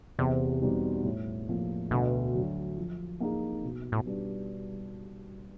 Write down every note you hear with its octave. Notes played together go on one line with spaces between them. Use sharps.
E2 C3
B2 G3 C4 D#4
A2
F3 A#3
D2 B2
D3 F#3
F3
A#3 D#4 G#4
B2
A2
G3 B3 D4